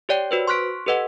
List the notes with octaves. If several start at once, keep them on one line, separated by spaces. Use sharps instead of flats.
G4 C#5 D5 G5
F#4 B4 C5
C6 C#6 F6 F#6 B6 D7
G4 A4 B4 D#5 F#5